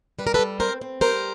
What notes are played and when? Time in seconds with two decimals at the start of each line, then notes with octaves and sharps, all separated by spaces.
0.19 G3 B4
0.27 A#4
0.34 A4 B4
0.39 G3
0.60 C4 A#4 C5
0.81 C4
1.01 G3 A#4 C5